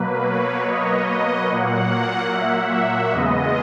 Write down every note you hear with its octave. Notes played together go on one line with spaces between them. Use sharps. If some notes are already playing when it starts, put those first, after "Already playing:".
Already playing: B2 F#3 A#3 B4
C#5
D#5
A#2 F#3 A#3 F#5
E5
E5
E2 C#3 G#3 B3 D#5